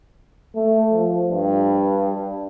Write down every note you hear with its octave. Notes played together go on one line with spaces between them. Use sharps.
A3
F3
G2